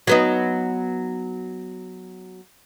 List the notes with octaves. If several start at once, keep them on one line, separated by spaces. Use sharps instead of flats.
F#3 B3 D#4